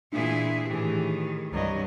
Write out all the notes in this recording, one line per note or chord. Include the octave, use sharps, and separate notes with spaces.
A#2 E3 D4 E4 G#4
A2 D#3 E3 G4 G#4
C2 G2 F#3 D#5